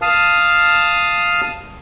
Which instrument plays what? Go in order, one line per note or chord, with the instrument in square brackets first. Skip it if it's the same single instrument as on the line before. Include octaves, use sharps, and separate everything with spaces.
[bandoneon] F5 A5 D#6 F6